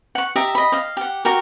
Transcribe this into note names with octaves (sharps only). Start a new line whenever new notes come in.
F#5 C#6
G4 D#5 E5 A#5
D#5 B5
D#5 F5
G4 F#5
F#4 G4 A#4